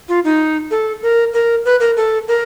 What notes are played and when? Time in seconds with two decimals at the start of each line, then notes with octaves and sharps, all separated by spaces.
0.09 F4
0.25 D#4
0.71 A4
1.03 A#4
1.34 A#4
1.65 B4
1.80 A#4
1.97 A4
2.28 A#4